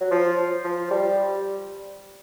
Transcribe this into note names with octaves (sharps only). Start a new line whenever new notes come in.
F#3
F3
F3
G3